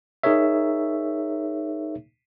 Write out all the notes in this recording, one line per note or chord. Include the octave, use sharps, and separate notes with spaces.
D#4 G#4 A#4 C#5 E5